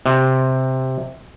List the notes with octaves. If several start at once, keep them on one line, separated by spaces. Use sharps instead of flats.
C3